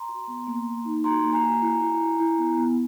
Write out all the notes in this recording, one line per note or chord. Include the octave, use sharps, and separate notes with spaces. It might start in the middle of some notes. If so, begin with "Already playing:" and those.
Already playing: A#5 C6
F#4
B3
A#3
A#3
D#4
F#4 A#5 C6
A#3
G#5 A#5
F#4
E4
E4
E4
E4
B3
B3